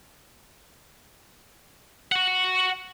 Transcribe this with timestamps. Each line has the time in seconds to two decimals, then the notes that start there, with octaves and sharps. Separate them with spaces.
2.12 F#4 F#5